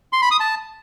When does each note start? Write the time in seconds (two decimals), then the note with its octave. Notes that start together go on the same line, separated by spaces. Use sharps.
0.13 C6
0.22 B5
0.31 D#6
0.40 A5